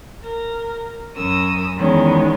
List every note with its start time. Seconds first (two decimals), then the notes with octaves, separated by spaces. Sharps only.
0.22 A#4
1.15 F#2 C#4 A#4 D#6 E6
1.78 E2 D#3 G#3 B3 C#4